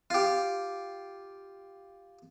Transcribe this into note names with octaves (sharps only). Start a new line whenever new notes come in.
F4 G4